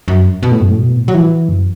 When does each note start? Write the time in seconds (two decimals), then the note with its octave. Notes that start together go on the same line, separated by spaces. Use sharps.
0.08 F#2
0.43 B2
0.51 A2
0.60 F#2
0.69 A2
0.78 B2
0.96 A2
1.08 F#3
1.14 E3
1.49 F#2